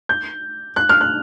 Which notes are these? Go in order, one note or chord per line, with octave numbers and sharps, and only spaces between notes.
G6
F#6
F6
F#6